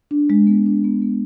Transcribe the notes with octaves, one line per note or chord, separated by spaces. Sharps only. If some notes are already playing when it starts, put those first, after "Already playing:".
D4
G#3
B3
D4
B3
B3